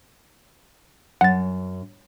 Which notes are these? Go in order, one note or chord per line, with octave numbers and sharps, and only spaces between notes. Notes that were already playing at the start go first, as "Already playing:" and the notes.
F#2 F#5 A6